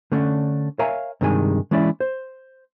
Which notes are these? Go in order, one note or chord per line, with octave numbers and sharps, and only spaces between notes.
D3 A3 C#4 D4
A#4 C#5 E5 F5 G#5 A#5
G2 C3 D#3 G#3 G#5
E3 G#3 C#4 E4 D5
C5